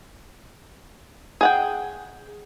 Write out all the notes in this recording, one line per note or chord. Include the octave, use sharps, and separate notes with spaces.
G#4 F#5 G5